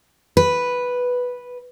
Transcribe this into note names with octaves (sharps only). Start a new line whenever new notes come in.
B4